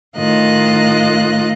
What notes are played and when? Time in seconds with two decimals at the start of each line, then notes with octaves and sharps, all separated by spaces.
0.16 A2 D#3 F4 D#5 F#6